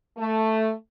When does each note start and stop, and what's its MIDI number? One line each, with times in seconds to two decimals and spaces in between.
0.18 0.71 57